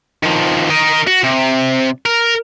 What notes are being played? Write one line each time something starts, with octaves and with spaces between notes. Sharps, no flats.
D#3 F3
A#4 D#5
F#4
C3
A#4